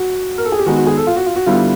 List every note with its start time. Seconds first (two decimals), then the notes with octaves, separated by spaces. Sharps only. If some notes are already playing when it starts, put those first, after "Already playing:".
Already playing: F#4
0.38 A#4
0.45 A4
0.52 G#4
0.59 G4
0.66 D#3 G#3 B3 D#4 F#4
0.76 F#4
0.87 G#4
0.97 A4
1.07 F4
1.16 F#4
1.26 F4
1.36 F#4
1.46 D3 G3 B3 E4 F4